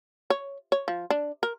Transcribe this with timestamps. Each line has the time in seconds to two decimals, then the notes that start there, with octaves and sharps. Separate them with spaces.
0.30 C#5
0.72 C#5
0.88 F3
1.10 D4
1.43 A#4